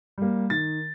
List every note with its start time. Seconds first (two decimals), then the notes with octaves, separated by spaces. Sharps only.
0.18 G3 A#3
0.50 D#3 A6